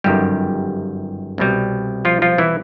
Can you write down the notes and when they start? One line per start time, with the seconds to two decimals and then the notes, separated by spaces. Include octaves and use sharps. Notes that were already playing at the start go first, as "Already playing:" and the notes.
0.04 G1 F#2 D#3 G3 G4
1.38 C2 B2 G3
2.05 F3 F4
2.22 F3 F4
2.38 E3 E4